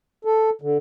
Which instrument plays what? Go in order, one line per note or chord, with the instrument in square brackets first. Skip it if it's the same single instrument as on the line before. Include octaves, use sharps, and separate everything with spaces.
[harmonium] A4
D3